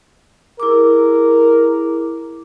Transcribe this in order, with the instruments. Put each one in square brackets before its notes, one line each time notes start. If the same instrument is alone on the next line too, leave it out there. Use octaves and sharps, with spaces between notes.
[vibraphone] E4 G#4 D6 [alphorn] A#4